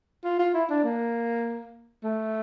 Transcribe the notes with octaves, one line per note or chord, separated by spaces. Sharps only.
F4
F4
E4
D4
A#3
A3